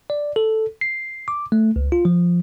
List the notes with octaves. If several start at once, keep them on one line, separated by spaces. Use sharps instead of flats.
D5
A4
C7
D6
A3
C#2
F4
F3